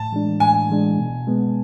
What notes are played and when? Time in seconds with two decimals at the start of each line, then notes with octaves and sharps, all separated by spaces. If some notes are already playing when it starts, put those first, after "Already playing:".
Already playing: A2 A5
0.12 E3 G#3 D4
0.40 A2 G#5
0.70 E3 G#3 D4
0.99 B2
1.27 G#3 B3